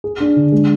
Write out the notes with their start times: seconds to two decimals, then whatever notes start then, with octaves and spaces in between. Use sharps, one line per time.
0.04 G#4
0.20 D4
0.36 D3
0.52 G#3